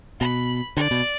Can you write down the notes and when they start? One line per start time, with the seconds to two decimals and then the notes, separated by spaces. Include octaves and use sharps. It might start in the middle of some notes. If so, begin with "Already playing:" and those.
0.20 B2 B5
0.76 D3 D5
0.91 B2